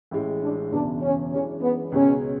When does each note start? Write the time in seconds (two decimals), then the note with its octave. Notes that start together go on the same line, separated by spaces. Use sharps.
0.11 A1 A2 G#3
0.41 D4
0.71 F#1 E2 B2 D4
1.02 C#4
1.32 F#2 E3 G#3 C#4 D4 G#4
1.62 B3
1.92 C#2 B2 G#3 C#4